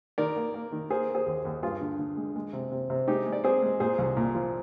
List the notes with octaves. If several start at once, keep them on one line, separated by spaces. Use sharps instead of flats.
D#3 A#4 D5
A#3
A#3
D#3
A#3 G#4 C5
A#3
G#4 C5
D#2
D#2
G2 F4 G#4
D3
D3
G#3
G#3
C3
C3
C3
G#3 D#4 G4
G#3
D5
C4 G#4 C5
G#3
A#2 G#4 C5
C2
A#2
F3